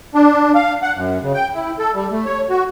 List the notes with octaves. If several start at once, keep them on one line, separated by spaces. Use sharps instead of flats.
D4
F5
F#5
F#2
C#3
G5
E4
A4
G3
A3
C#5
F#4